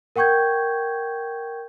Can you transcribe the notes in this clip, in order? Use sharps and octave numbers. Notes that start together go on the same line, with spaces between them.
A#4 F#5 G5 C#6 G6 G#6